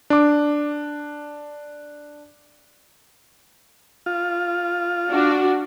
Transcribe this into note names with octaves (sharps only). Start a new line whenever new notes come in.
D4 D6
F4
D4 F#4